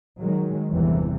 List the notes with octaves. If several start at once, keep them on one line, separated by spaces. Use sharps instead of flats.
D#3 F#3 G#3
G1 E2 C3 E3